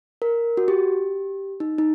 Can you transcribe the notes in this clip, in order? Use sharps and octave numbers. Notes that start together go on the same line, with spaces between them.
A#4
F#4
G4
D#4
D#4